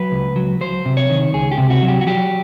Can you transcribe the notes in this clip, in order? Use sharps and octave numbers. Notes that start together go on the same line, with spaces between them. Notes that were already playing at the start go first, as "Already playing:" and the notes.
Already playing: F#3 B4
C#2
F#3
F#3 C5
C3
C#5
D#3
C#2 G#4
G4
C3
F#4
F#3
G4
F#4
F#3 G4